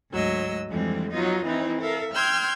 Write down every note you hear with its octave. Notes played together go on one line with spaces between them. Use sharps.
D2 G#2 F#3 D#5 E6
F2 D3 E3 G3 G#3 C4
F#3 B3 D#4 F4 D#5
E3 C4 D#4 E4
A4 A#4 E5 F5
G5 C6 E6 F6 G6 G#6